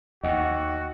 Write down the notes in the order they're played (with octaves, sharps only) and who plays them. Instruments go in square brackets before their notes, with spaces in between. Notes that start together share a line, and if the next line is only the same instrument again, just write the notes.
[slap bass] D#2 [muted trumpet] F#4 [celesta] D#5 F#5 G5